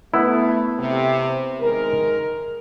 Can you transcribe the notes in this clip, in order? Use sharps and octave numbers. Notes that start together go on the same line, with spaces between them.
A3 B3 E4
C3
D#3 G#3 A#4